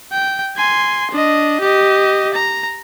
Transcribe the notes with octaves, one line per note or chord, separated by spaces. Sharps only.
G5
G#5 C6
D4 D#5
G4 D#5
A#5